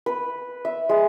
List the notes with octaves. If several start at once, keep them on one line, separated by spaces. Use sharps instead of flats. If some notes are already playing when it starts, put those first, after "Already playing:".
B4
E5
G#3